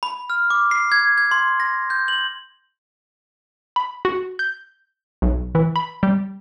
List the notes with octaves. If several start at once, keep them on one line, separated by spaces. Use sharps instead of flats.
B5
F6
D6
C7
G#6
G#6
C6
A#6
G6
F#7
B5
F#4
G6
B1
E3
B5
G3